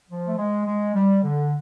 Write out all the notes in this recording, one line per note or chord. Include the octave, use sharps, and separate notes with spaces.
F3
A3
G#3
G#3
G3
D3